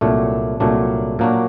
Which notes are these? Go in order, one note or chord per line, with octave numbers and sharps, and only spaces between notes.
C2 A#2 F#3 A3 D4
C2 A#2 F#3 A3 D4
A#2 F#3 A#3 D4 F#4